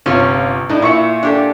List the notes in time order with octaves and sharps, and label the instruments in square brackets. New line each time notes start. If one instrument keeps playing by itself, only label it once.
[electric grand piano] G1 C3 F4 [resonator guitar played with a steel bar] C#4 C#5
[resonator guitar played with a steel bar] A2 [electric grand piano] D4 D#4 D#5
[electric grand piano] A#2 C#6 C#7 [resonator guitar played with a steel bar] E4 E5
[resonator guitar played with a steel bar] D4 G4 A4